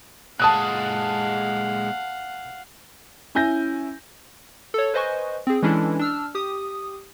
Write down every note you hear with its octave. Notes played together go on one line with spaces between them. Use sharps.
A#2 G#3 F5 F#5 A5 D#6 F#6
C#4 E4 G#5 G6 A#6
A4 C#5
B4 C5 D#5 G#5 C#6
C4 G#4
E3 G#3 C#4 D4 E4 A4
D4 E6 F6
G4 D#6